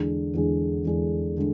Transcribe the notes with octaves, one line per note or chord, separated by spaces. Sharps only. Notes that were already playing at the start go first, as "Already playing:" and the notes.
Already playing: E2 D3 G#3 D4 G#4
E2 D3 G#3 D4 G#4
E2 D3 G#3 D4 G#4
D3 G#3